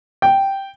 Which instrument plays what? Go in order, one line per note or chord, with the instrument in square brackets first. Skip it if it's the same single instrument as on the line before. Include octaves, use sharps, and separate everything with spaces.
[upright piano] G5